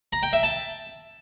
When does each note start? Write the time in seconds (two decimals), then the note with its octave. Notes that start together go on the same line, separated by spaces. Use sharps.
0.13 A#5
0.23 G5
0.33 E5
0.43 A5